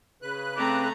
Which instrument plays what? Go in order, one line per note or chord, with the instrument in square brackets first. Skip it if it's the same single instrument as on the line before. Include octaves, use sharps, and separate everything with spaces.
[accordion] C#3 B4 F#6
[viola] A3 A#5 [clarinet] C4 [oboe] D6